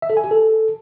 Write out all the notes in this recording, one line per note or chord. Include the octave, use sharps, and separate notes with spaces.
E5
A4
G#5
G4
A4